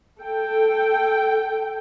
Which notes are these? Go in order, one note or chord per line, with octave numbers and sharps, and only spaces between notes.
A4 G5